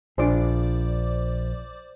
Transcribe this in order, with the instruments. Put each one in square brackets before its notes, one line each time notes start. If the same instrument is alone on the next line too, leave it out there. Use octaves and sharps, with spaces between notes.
[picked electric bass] A#1 [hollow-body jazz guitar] D4 F4 G#4 [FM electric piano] C5 D5 D6